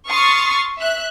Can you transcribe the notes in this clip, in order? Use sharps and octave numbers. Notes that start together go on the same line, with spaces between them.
C6 C#6 D#6 F6 A6 C7
E5 F#6